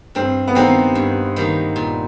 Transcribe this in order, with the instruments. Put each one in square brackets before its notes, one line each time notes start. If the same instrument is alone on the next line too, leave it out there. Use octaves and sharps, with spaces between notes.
[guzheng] G2 [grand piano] C4
[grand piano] B3
[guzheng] D#3 G3 A#3 D#4 [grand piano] C4
[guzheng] G2
D#3 G3 A#3 D#4
A#2